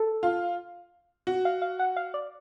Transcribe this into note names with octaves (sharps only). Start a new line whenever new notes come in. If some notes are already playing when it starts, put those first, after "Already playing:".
Already playing: A4
F4
F#4
F5
F5
F#5
F5
D5